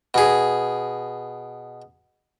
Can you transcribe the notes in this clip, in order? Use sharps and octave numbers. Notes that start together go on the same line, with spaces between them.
B2 G#4